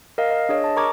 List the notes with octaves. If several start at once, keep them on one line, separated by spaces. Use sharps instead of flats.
A#4 D#5 F5
D#5
D4 G#4 C#5 D#5
A5
A#4 A#5 C#6 D6 G#6